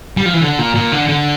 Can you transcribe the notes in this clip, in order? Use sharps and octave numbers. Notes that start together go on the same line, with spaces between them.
G3
F3
E3
D3
A#2
A#2
D3
D3